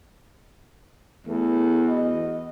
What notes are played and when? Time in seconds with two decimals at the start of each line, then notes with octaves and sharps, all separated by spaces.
1.27 E2 A3
1.88 F#4 D#5